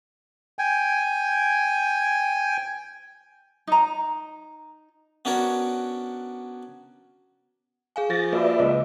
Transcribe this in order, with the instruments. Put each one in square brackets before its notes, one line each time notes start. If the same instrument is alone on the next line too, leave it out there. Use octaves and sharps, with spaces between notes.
[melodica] G5 G#5
[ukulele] D#4 A#5
[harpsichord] B3 C#4 D4 F#4 A#4 C#5
[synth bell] G#4 F5 G#5
[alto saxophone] F3 [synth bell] G#4 [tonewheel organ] A6 A#6
[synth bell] A#3 F#4 [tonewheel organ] B4 D5 E5
[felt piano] C#2 D#5